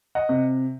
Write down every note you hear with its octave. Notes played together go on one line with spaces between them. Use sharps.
D#5 F#5
C3